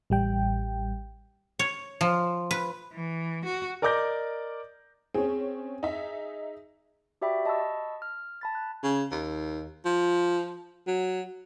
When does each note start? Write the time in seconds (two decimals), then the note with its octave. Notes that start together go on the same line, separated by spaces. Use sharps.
0.10 A1 G3 G5
1.59 C#5
2.01 F3
2.51 B4
2.93 E3
3.45 F#4
3.82 A#4 D5 D#5 D6 G6 A#6
5.14 C4 C#4 G#4
5.83 D#4 E5
7.22 F#4 G4 D5 E5 G5 B5
7.45 D#5 A5 B5 C#6 E6
8.02 F6
8.41 A5 B5 A6
8.55 F#6
8.83 C#3
9.12 D#2
9.85 F3
10.87 F#3